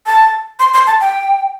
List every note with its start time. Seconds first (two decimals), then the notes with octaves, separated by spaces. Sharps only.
0.06 A5
0.59 C6
0.74 C6
0.87 A5
1.01 G5